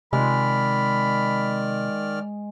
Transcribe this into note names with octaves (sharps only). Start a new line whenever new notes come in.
C3 D#3 G#3 D5 B5 F6